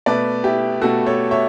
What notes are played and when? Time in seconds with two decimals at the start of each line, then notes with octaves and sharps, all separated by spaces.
0.06 B2 A3 B4 D5
0.44 E4 G4
0.81 B2 A3 F#4 A4
1.06 A4 C#5
1.31 C#5 E5